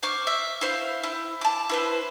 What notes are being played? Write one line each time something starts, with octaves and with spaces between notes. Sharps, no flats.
C5 C#6 D6 F6
E5
E4 C5 F5
E4
A5 D6
E4 B4 C5